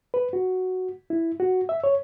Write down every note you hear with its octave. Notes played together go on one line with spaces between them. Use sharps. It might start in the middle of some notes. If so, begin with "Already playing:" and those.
B4
F#4
E4
F#4
E5
C#5